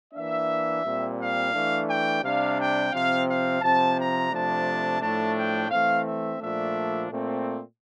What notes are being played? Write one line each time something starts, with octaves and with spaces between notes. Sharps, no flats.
E3 A#3 D4 E5
A#2 G3 C4
F5
E3 A3 D4
G5
C3 G3 D4 F5
G5
C3 F3 C4 F5
F5
C3 F3 C4 A5
A#5
C3 F3 A3 D4 A5
A2 F3 A3 D4 A5
G5
E3 A3 C4 F5
E5
A#2 F3 A3 D4 E5
A#2 A3 C4